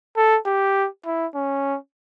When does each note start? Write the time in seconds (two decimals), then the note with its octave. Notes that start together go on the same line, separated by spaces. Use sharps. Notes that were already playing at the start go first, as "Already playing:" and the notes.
0.17 A4
0.46 G4
1.05 E4
1.35 C#4